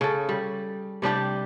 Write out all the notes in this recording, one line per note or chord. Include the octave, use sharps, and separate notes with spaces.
C#3 A4
G3
C3 G3 D4 G4